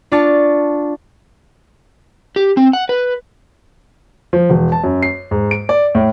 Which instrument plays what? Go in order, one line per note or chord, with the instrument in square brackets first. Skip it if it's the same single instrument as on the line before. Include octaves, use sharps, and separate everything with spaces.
[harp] D4 F4 A5 C#6
[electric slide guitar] G4
C4
F#5
B4
[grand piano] F3
E1
A5
F#2
C7
G#2
D7
D5
A2